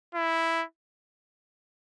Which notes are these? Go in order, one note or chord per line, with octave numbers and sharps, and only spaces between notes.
E4